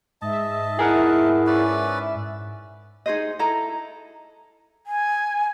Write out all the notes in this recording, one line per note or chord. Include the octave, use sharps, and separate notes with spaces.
G#2 D#5 E5 A5
E4 G#4 A#4 F#5
C#4 B4 D5
D#4 G#4 C5 D#5
E4 A4 D#5 A#5
G#5